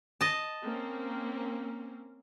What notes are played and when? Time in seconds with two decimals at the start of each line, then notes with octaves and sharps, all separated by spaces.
0.21 D#5 A5
0.63 A#3 C4 C#4